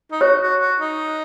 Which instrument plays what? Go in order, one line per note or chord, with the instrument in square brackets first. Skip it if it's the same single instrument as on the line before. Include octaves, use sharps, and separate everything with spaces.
[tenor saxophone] D#4
[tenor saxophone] F#4 [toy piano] C#5
[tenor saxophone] F#4
F#4
D#4